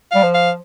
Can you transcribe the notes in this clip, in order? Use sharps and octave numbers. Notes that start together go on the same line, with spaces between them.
G3 F5
F3
F5